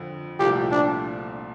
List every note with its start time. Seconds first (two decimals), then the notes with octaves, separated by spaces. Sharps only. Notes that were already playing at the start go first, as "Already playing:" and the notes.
Already playing: F2 D3
0.39 C2 A#2 F3 A3 G4
0.71 D4